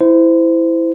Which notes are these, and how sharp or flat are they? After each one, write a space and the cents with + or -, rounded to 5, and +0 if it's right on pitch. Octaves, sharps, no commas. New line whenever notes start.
E4 +0 C5 -25